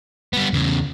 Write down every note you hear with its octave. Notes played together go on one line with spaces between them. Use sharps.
G3 B3
E2 C#3